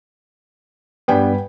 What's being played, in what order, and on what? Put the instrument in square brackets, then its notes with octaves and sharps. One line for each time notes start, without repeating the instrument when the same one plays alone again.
[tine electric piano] G2 G3 B3 [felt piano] B4 G5 G#5